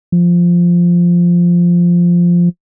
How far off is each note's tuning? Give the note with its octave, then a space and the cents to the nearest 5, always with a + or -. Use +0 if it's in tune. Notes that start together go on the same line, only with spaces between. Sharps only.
F3 -5